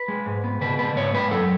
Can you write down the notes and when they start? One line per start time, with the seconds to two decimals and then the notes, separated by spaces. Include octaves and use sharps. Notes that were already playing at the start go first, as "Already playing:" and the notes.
Already playing: B4
0.08 G#3
0.26 G#2
0.44 B3
0.61 C#3 B4
0.78 B3 B4
0.96 G#2 C#5
1.14 G#3 B4
1.31 F#2 A4